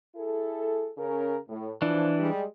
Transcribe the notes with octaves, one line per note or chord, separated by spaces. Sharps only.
E4 G#4 A4
C#3 C#4 A#4
A2
E3 F3 D4
G3 G#3